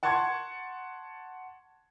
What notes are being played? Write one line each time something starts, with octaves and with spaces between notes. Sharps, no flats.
F#5 A5 C6 C#6 G#6